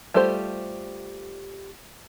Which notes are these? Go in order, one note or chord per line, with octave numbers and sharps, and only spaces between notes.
G3 A3 F4 G4 C5